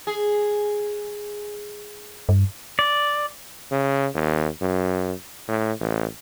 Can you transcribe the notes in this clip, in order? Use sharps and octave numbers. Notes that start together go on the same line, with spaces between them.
G#4
G2
D5
C#3
D#2
F#2
A2
A1